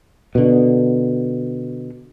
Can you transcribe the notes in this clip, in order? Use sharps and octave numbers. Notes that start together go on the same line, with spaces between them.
B2 D3